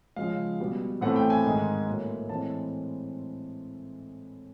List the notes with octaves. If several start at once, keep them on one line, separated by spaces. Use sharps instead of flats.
C#3 F3 G#3 F5
B2 G3 B3
A2 E3 A3 C4 F#5
G5
G#5
G#2 D#3 G#3
A2 F#3 A#3
A2 E3 G#3 C4 A5